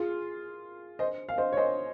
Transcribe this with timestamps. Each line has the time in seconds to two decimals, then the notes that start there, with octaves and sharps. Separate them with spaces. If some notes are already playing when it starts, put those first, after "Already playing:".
Already playing: F4 G#4
0.99 C5 D#5
1.29 F5
1.38 C5 D#5
1.53 C#5
1.57 C5 D#5